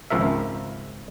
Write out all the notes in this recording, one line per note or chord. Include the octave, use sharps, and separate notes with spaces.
G#1 C#2 F3 A#4 E5